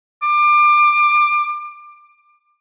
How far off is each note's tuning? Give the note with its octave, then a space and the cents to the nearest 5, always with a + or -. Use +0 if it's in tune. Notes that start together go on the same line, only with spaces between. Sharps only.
D6 +25